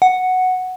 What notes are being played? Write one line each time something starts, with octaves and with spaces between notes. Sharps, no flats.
F#5